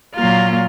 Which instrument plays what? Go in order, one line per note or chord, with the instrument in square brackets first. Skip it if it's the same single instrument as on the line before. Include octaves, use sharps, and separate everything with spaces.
[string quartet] A#2 F#3 A#3 F4